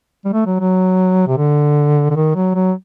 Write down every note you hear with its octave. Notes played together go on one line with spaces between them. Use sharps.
G3
A3
F#3
F#3
C3
D3
D3
D#3
F#3
F#3